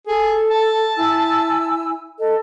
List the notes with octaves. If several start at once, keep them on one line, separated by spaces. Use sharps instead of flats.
G#4 A4
A5
E4 G#5 E6
A4 D#5